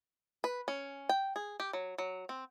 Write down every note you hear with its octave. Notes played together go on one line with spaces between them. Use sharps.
B4
C#4
G5
G#4
G4
F#3
F#3
C4